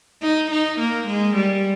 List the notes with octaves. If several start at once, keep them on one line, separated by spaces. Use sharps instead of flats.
D#4
D#4
A#3
G#3
G3